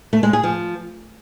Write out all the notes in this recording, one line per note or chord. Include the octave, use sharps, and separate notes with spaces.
A3
G#3
G#4
F3